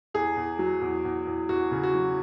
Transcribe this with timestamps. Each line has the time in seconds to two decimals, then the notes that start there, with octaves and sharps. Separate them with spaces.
0.14 E2 G#4
0.37 E2
0.59 F#3
0.81 E2
1.05 E2
1.27 E2
1.49 E2 F#4
1.71 C#3
1.83 F#4
1.95 F#3